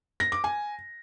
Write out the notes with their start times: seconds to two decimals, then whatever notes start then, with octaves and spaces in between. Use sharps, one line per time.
0.20 A#6
0.32 D6
0.44 G#5